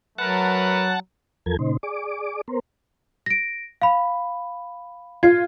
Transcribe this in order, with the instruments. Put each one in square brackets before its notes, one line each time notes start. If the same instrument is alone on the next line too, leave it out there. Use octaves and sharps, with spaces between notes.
[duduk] F#3 [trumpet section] A3 A#4 B4 [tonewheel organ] F#5 A5
[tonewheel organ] E2 F3 A4 A#4 G#6
A#2 C#3 D#4 C5
G#4 D5 D6
B3 A#4 C5
[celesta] A#6 D7
F5 B5
[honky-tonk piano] F4 [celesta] G#6 C7